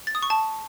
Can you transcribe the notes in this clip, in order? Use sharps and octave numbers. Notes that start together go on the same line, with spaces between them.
A6
D#6
C#6
A5